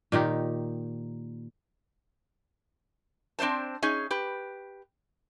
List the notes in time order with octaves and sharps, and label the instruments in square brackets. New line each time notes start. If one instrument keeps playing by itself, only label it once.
[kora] A#2 D#3 D#4 G4
[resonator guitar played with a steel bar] C4 D4 F4 C5 A5
C#4 D#4 G#4
G4 B4